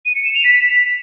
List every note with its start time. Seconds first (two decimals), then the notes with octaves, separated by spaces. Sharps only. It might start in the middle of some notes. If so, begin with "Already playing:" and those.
0.06 D#7
0.15 C#7
0.25 E7
0.35 F7
0.44 B6